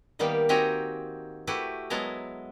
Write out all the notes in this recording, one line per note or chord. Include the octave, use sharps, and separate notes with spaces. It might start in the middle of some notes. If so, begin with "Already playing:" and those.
D#3 G3 A#3 B3 G4
C4 D#4 F#4 G4 G#5 A#5
A3 E4 F#4 G4 B4
F#3 G#3 B3 E4 A5 A#5